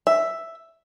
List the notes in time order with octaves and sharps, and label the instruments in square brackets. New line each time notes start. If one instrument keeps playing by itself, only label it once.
[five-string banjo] E5